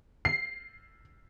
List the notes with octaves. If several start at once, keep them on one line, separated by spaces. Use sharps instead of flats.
C7